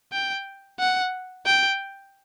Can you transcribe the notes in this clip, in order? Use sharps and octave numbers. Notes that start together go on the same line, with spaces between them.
G5
F#5
G5